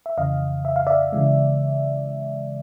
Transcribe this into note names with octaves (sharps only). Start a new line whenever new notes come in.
E5
F2 C#3 E3 D#5 F5
E5
F5
D5 E5
C#3 E3 G#3